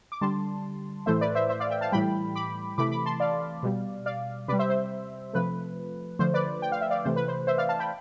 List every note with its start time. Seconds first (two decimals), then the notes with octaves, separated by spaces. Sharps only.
0.12 D6
0.21 D3 G3 A5 C6
1.06 A2 E3 A3 C5 E5
1.21 B4 D5
1.35 C5 E5
1.49 C5 E5
1.60 D5 F5
1.70 E5 G5
1.81 F5 A5
1.92 A2 E3 G3 G5 B5
2.36 B5 D6
2.78 C3 E3 A3 B5 D6
2.91 B5 D6
3.06 A5 C6
3.20 D5 F5
3.63 B2 G3
4.06 D5 F5
4.48 C3 G3 B4 D5
4.59 C5 E5
4.70 C5
5.33 C3 F3 A3 B4
6.19 D3 F3 A3 C5
6.34 B4 D5
6.62 G5
6.72 F5
6.81 E5
6.90 D5 F5
7.04 C3 E3 A3 C5
7.16 B4
7.28 C5
7.47 C5 E5
7.58 D5 F5
7.69 F5 A5
7.79 G5 B5